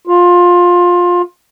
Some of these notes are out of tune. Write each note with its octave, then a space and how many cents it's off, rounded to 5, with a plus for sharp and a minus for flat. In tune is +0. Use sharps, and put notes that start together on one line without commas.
F4 +15